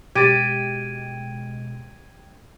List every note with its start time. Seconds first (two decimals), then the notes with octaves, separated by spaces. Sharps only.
0.15 B2 G#3 G4 G5 G#6 A6 D7 D#7